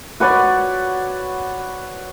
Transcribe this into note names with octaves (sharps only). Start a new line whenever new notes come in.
F#4 B4 C#5 D5